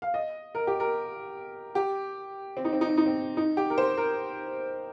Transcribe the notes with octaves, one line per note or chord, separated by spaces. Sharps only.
F5
D#5
A#4
G4
A#4
G4
C4
D#4
C4
D#4
C4
D#4
C4
D#4
G4
A#4
C5
A#4